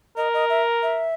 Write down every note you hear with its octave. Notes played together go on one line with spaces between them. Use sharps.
A#4 D#5
D#5
E5
E5